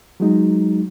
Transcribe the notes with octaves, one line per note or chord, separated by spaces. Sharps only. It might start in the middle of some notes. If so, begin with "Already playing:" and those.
F#3 G#3 D#4